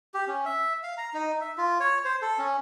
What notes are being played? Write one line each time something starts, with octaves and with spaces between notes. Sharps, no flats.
G4
C#4
E5
F5
A#5
D#4
E5
F4
C#5
C5
A4
C#4